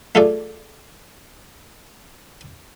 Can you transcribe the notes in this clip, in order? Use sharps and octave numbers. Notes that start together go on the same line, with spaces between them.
A3 F4 G#4 A4 D5